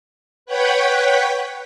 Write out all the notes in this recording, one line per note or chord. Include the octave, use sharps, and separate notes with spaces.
B4 C#5 F#5 G5 B5